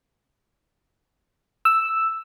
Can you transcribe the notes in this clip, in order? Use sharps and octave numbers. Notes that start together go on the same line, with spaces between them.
E6